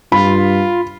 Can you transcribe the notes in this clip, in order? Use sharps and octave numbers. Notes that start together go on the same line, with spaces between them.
G2 F4 B5